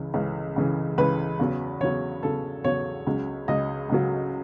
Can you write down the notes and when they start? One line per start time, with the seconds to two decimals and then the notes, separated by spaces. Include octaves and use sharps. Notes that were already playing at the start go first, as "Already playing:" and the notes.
Already playing: C#2 C#3 E3
0.14 C#2 C#3 E3
0.56 C#2 C#3 E3
0.98 C#2 C#3 E3 B4
1.39 E2 C#3 F#3
1.81 E2 C#3 F#3 C#5
2.23 E2 C#3 F#3 A4
2.64 E2 C#3 F#3 C#5
3.07 C#2 C#3 F#3
3.48 C#2 C#3 F#3 D#5
3.89 C#2 C#3 F#3